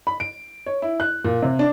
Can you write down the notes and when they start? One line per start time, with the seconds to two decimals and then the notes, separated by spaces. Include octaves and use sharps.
0.07 B5
0.20 D7
0.66 C#5
0.82 E4
1.00 F#6
1.24 A#2
1.42 C3
1.59 D4